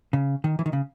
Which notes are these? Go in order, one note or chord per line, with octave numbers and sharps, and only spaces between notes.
C#3
D#3
E3
D#3
C#3